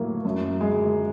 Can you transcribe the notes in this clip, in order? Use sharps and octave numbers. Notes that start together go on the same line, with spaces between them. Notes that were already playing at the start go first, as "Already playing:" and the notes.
Already playing: A2 F#3 A#3
F#2
G#3